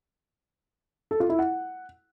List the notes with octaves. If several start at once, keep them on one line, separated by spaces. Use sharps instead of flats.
A4
F4
E4
F#5